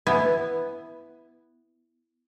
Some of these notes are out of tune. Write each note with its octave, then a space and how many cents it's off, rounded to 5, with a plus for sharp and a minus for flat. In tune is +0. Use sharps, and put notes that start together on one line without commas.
B3 +0 E4 +0 G#5 +15